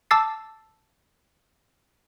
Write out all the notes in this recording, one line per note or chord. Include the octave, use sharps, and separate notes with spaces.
A5 D6 E6 A6 C7